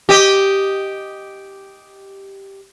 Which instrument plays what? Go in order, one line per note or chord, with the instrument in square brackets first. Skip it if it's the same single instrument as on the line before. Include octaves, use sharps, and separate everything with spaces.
[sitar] G4 D#5